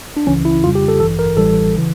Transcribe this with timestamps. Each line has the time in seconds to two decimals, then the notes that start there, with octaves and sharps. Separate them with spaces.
0.17 D4
0.27 C#2 C#3 E3 C#4
0.45 E4
0.63 F2 C#3 G3 F4
0.75 G4
0.88 A4
1.00 A1 G2 E3 A4
1.19 A#4
1.37 A1 A2 E3 G3 A4
1.76 C#3 E3